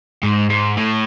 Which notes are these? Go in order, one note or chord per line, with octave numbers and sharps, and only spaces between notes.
G#2
G#2
A2